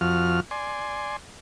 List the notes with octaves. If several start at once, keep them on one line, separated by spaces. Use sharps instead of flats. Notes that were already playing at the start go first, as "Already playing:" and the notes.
F2 F3 F#4 F6
D5 G#5 C6